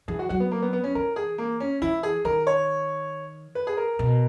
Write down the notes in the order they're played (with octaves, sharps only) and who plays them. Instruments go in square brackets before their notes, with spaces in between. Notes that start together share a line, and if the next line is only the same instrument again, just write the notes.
[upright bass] E3 [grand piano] G#4
[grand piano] F#4
[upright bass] F#3 [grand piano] F#4
[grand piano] B3
A#3
B3
B3
C#4
[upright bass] E3 [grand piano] A#4
[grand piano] G#4
A#3
C#4
[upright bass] E3 [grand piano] E4
[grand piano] G#4
[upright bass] D#3 [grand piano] A#4
[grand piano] C#5
B4
G#4
A#4
[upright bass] B2